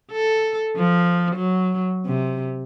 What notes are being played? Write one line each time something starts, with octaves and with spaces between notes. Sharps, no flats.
A4
F3
F#3
C3